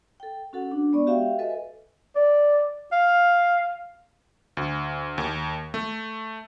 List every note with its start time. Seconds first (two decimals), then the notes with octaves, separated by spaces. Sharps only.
0.20 A4 G5
0.53 C#4 F#4 A4 F#5
0.71 D4
0.93 G#3 B3 D5 C#6
1.07 F#4 G4 E5 F5 G5
1.39 A4 B4 D#5 E5 G#5
2.16 D5
2.92 F5
4.57 D2
5.18 D#2
5.74 A3